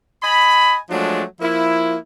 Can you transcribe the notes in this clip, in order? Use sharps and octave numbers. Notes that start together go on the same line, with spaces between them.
D#5 G#5 B5
F3 F#3 G#3 A3 D4
F3 A#3 E4